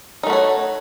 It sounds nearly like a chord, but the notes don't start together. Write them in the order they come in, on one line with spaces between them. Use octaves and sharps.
D#4 A3 F#4 C#5